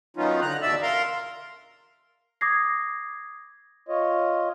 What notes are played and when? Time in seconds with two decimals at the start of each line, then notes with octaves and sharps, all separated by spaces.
0.17 D#3 F#3 B3 C#4 D#4 F4
0.41 D3 A#5 F#6
0.62 E2 B2 D5 E5 E6
0.82 A#4 F5 A#5 C6
2.41 D6 D#6 G#6 A#6 C7
3.88 F4 C#5 D#5